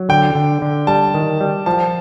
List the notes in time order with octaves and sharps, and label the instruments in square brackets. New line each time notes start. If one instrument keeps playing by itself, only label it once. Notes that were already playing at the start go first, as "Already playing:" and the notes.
Already playing: [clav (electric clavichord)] F#3
[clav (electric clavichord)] D3 [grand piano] G5
[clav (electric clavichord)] D3
D3
[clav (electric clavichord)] G3 [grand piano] A5
[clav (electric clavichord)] D#3
G3
[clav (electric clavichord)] F3 [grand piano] A5